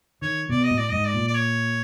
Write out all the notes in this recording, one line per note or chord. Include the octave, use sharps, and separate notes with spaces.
D#3 C#5
B2 D5
D#5
A2
D5
G#2 D#5
D5
A#2
D5
C#5